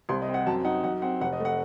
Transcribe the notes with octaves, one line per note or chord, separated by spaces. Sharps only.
C2 C6
D#5
C4
F#5
F#2 A5
D#4 F#5
F#2 F#5
C4 F#5
F1 F#5
D#5
A3
F#5